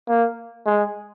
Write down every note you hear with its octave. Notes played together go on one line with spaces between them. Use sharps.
A#3
G#3